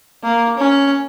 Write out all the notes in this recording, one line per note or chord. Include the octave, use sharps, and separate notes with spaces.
A#3
C#4